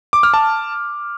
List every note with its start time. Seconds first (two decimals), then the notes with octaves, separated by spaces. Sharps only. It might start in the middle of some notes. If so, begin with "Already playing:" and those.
0.13 D6
0.23 F6
0.34 A5